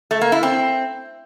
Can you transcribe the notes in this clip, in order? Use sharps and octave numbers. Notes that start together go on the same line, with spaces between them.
A3
A#3
E4
C4